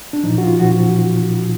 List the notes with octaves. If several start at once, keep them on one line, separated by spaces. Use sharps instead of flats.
D4
A#2 F3 D#4
F#4
F4
A#2 F3 F#4